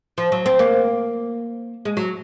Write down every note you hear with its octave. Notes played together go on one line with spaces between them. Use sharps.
F3
F#3
C4
A#3
G#3
F#3